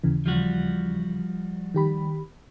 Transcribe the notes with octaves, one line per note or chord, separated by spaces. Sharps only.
D#2 C#3 E3
F3 G3 F#4
D#3 G4 B5